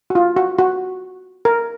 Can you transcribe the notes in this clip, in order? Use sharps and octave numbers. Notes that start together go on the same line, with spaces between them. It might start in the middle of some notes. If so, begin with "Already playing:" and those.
F#4
F4
F#4
F#4
A#4